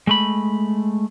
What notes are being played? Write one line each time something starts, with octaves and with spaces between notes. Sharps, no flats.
G#3 A3 B5